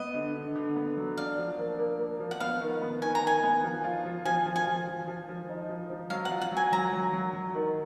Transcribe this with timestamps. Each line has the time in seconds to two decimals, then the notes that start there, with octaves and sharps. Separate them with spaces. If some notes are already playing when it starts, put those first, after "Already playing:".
Already playing: B3 D#5
0.14 D3
0.35 D3
0.55 D3
0.76 B3
0.97 F#3
1.17 D4 F5
1.38 F3
1.58 A#3
1.79 A#3
1.99 A#3
2.20 F3
2.31 F#5
2.40 B3 F5
2.61 D#3
2.82 B3
3.02 D#3 G#5
3.15 A#5
3.23 D#3 G#5
3.43 B3
3.63 F3
3.84 F4
4.05 F3
4.25 F3 G#5
4.46 F3
4.56 G#5
4.67 F3
4.87 F3
5.07 F3
5.29 F3
5.49 D#4
5.70 F3
5.90 F3
6.10 F#3 F5
6.25 F#5
6.31 F4
6.42 F#5
6.51 F#3
6.57 G#5
6.72 F#3 A#5
6.93 F#3
7.13 F#3
7.34 F#3
7.54 D#3